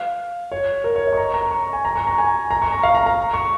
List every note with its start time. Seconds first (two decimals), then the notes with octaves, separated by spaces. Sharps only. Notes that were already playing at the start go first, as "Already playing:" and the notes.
Already playing: F5
0.52 C#5
0.84 A#4
0.96 C#5
1.07 D#5
1.13 C#6
1.17 A#5
1.34 A#5
1.51 C#6
1.73 G#5
1.85 A#5
1.96 C#6
2.07 A#5
2.18 G#5
2.51 A#5
2.62 C#6
2.72 A#5
2.83 F5
2.95 A#5
3.06 A#5
3.33 C#6